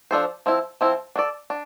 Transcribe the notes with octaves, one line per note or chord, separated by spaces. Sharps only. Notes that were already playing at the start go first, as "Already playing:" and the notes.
F3 A3 D4 A4 C5
F3 C4 E4
F3 C4 E4
D4 A4 D5
D4